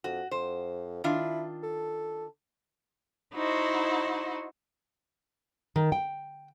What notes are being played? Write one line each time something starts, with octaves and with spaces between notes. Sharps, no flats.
F2 F#4
F2 C5
D#3 D4 E4 F4
A4
D#4 E4 F#4 C5
D#3
G5